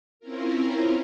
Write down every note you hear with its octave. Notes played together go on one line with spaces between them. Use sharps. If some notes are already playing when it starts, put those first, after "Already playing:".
C4 C#4 E4 F4 A#4